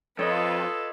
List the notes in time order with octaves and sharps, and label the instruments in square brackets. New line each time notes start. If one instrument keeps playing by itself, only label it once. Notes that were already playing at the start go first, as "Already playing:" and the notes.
[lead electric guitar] F2 [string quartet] F4 B4 [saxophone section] A4 [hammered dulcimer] C#5 D#5